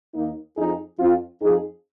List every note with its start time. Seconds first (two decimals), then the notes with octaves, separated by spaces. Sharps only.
0.14 D#2 D#3 A#3 D#4
0.56 F2 F3 D#4 G#4
0.98 F2 F3 C4 F4
1.40 F2 F3 D#4 G#4